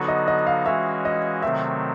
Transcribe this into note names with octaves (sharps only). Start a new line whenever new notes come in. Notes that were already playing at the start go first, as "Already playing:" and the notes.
Already playing: D3 F#3 B3 D#4 F#4
D#5
D#5
F5
E3 G#3 C#4 F#4 E5
D#5
C3 D#3 F#3 A3 C4 E5